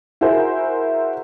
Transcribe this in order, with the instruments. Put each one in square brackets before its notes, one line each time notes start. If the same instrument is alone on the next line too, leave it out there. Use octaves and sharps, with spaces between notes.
[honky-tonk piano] E4 F#4 G#4 A#4 C5